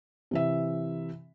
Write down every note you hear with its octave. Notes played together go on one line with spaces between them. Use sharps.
C3 E3 E5